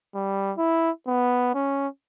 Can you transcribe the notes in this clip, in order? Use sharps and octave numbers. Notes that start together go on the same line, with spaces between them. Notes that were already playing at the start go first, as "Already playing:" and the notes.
G3
E4
B3
C#4